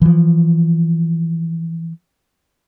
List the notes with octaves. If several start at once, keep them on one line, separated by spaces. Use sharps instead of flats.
E3 F3